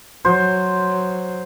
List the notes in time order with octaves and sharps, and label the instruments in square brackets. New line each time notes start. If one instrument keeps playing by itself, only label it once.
[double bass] F#3 [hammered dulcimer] C5